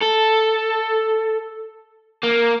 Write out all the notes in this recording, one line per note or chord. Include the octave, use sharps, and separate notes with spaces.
A4
A#3